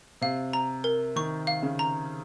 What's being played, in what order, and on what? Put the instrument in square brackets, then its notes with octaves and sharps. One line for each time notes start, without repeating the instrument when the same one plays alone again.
[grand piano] C3 [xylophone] F5
[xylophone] A#5
A#4
[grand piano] D#3 [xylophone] C#6
[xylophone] F5
[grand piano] C#3
[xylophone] A#5